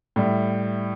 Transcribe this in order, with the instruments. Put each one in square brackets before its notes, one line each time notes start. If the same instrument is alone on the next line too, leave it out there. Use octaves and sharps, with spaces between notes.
[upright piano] A2 G3 E4